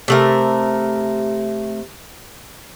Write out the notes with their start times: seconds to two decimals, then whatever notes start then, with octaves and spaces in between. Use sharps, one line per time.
0.08 C3 A3 A#4